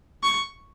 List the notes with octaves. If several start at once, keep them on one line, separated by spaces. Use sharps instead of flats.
C#6